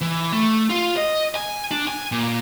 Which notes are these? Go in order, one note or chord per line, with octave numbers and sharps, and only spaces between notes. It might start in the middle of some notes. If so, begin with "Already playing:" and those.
E3
A3
F4
D#5
G#5
D4
G#5
A#2